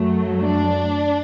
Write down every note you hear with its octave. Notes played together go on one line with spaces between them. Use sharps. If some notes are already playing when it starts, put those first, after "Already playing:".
Already playing: F#2 F#3 A3
D4